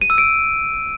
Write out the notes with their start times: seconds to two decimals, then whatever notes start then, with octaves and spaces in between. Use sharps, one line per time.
0.01 D#7
0.10 E6
0.18 D7